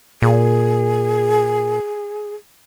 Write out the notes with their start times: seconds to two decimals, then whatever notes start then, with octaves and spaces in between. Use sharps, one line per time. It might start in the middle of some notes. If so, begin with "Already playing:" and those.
0.22 A#2 G#4